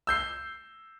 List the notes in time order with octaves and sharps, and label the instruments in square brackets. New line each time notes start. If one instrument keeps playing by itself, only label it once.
[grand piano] E6 G6 C7